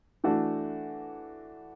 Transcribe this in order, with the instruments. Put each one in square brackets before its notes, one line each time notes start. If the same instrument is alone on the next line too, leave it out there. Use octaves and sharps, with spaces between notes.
[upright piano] E3 A3 D4 F#4